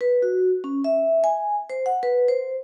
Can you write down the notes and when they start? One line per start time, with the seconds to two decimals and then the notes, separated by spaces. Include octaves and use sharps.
0.01 B4
0.22 F#4
0.64 C#4
0.84 E5
1.24 G#5
1.70 C5
1.86 F#5
2.03 B4
2.28 C5